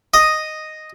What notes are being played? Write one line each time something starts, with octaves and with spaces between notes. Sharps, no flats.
D#5 D#6